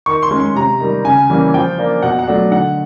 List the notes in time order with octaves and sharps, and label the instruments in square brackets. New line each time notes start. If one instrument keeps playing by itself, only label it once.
[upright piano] D#3 C#6
C6
G#3 C#4
C6
C3 A#5
D#3 G3
C#3 G#5
E3 G3 A#3 C#4
F3 G5
A#3 D4
B2 F#5
F#5
F#3 A3 D4
D3 F#5